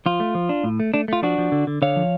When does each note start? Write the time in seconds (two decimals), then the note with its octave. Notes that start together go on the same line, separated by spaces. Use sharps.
0.06 F3 F4
0.20 A3
0.35 F3
0.49 D4
0.64 A2
0.80 A3
0.94 A3 D4
1.08 A3 F4
1.22 F3 D4 F#4
1.38 F3
1.52 D3
1.67 D3
1.82 D3 C#5 F5
1.96 F3